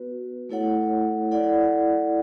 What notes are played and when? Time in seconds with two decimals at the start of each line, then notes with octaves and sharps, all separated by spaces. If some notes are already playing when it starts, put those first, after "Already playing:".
Already playing: B3 F#4 B4
0.49 A3 E4 A4 C#5 F#5
1.31 E4 A4 D5 F#5